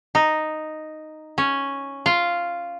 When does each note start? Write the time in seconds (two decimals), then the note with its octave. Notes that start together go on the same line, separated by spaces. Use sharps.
0.15 D#4
1.38 C#4
2.06 F4